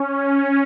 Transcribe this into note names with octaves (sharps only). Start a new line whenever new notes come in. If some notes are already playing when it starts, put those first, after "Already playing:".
Already playing: C#4